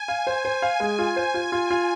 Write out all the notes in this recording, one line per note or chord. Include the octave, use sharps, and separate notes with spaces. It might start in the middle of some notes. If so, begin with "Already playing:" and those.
Already playing: G#5
F5
C5
C5 G#5
F5
G#3
F4
C5
F4
F4 G#5
F4